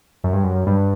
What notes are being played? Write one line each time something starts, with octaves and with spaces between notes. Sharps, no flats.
F#2
G2
F#2
G2